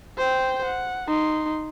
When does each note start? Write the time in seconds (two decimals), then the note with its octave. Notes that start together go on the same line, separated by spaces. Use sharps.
0.18 C5 G5
0.65 F#5
1.08 D#4 C6